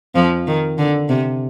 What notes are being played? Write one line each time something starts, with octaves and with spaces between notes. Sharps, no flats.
F2 F3
D#3
D3
C3